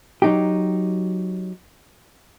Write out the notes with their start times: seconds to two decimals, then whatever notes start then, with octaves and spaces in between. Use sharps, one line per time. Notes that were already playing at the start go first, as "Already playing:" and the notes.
0.22 F#3 D#4 G4